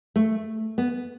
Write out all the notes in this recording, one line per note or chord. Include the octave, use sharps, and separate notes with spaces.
A3
B3